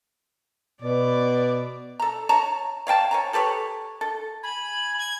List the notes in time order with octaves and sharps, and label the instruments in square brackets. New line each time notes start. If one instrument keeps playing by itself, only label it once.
[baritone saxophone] B2 [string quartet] D5
[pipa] A4 A#5
C#5 A5 A#5
C#5 F5 G5 A5
C#5 G#5 A#5
G4 A4 B4 C#5
A4
[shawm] G#5 [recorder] B5
[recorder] G#6